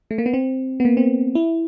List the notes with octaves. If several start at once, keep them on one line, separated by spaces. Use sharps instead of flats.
A3
A#3
B3
C4
B3
A#3
C4
E4